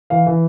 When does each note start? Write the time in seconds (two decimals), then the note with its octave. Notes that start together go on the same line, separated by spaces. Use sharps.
0.10 E3 F5
0.26 E3